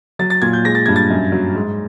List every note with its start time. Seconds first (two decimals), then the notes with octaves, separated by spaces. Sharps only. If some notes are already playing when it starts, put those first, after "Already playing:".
0.19 F#3 A6
0.30 A6
0.42 A#2 G#6
0.53 G6
0.65 G#3 A#6
0.75 A6
0.86 G2 G#6
0.96 A6
1.10 F#2
1.32 F#3
1.55 G#2